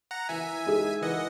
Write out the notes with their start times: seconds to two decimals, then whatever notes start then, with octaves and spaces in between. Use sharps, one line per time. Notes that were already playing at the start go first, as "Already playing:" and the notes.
0.11 F#5 A#5
0.29 E3 E5 G#5
0.66 G#3 D#4 G#4
1.01 E3 D#5 F#5